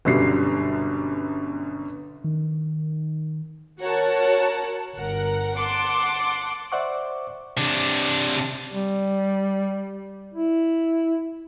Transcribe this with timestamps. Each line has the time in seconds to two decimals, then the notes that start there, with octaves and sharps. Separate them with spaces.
0.05 G1 F#2 B2 G3 C7
2.24 D#3
3.80 F#4 A#4 C#5 F#5 A5
4.96 G1 A#4 F#5
5.57 F#5 A5 C6 D6
6.72 C5 D5 E5 F#5 C#6 D6
7.57 C3 D4
8.72 G3
10.34 E4